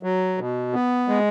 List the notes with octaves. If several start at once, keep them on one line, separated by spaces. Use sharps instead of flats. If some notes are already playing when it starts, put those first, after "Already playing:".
F#3
B2
B3
G#3